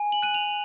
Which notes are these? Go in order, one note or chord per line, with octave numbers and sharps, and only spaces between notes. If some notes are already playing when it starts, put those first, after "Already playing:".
Already playing: G#5
F#7
F#6 D#7
F7